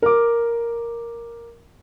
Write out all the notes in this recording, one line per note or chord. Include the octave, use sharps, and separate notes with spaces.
A#4 D6